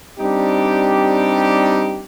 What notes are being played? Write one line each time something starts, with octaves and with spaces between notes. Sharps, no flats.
G3 C4 D4 D#4 G4